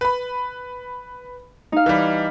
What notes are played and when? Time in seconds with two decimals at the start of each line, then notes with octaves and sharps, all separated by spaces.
0.01 B4 B5
1.72 D#4 F5
1.86 E3 G3